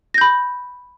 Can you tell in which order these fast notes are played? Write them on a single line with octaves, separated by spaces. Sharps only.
A#6 G6 B5